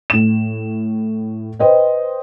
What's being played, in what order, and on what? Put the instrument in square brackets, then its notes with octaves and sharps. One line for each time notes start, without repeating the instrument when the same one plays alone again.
[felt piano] A2 E7
B4 C5 D#5 G5